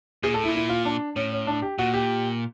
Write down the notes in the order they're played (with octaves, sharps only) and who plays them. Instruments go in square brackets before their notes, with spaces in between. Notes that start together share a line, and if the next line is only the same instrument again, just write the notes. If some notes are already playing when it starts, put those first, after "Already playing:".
[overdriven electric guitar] A#2 [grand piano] G#4
[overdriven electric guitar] A2 [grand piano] A4
[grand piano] E4
[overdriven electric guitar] A#2
[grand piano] E4
F4
D4
[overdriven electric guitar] A2 [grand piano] C#4
[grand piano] C#4
D4
G4
[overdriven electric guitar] A#2 [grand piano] F#4
[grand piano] G4